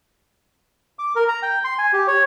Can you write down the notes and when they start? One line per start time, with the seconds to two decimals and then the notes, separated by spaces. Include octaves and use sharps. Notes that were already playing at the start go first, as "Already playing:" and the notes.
0.99 D6
1.16 A#4
1.28 A#5
1.43 G5
1.64 C6
1.78 G#5
1.93 G4
2.08 C#5